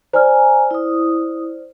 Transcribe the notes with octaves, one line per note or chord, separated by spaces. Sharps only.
C5 D5 G#5 A#5 F6
E4 D#6